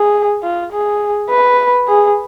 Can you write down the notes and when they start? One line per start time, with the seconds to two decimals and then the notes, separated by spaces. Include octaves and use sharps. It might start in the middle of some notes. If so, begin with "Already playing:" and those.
Already playing: G#4
0.43 F4
0.72 G#4
1.30 B4
1.88 G#4